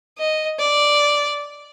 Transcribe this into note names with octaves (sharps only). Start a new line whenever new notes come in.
D#5
D5